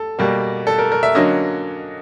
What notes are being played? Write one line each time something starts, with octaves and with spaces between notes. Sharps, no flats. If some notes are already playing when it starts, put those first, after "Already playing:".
Already playing: A4
B2 G3 A#3
A4
A#4
A#4
E5
D3 F#3 A#3 C#4 D#5